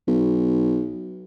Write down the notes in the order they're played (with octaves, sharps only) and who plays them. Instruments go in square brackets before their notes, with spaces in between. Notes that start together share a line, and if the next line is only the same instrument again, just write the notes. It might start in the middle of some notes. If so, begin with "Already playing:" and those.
[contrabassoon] B1